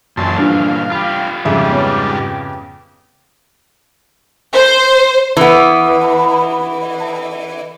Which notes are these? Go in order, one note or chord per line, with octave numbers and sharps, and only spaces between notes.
F#2 A#2 D3 E3 A5 C6
G2 F3 D4 F5
F4 G4 B5
F2 G#2 C#3 G3 E5
B3 C#5 B5
C5
E3 B3